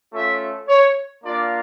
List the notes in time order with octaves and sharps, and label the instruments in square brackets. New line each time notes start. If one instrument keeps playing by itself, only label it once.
[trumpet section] A3 C#4 F4 E5
C#5
A#3 D4 F4 D5